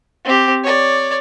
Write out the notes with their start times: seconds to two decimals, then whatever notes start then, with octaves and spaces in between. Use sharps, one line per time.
0.25 C4 G4
0.63 C#5 D5